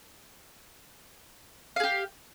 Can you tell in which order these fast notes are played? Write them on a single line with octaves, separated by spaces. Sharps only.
F5 G#4 G4